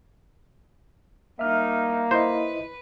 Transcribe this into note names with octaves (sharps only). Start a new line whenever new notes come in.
G3 A#3 D#4 E5 F6
E4 B4 C5 D#5